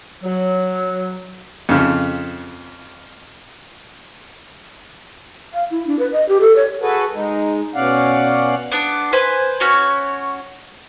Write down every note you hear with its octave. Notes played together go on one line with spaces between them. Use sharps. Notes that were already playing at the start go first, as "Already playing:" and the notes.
F#3
F2 C#3
F5
E4
D4
B4
D#5
G4
A4
C#5
F#4 G#4 A4 B4
G#3 D#4
B2 C#4 D5 F5 F#5
B3 D4
B4 C5 G#5
C#4 F#4 C#5